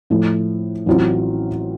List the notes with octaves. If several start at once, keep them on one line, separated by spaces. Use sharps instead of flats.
A2 F3 A3
A1 A2 F#3 C4 F4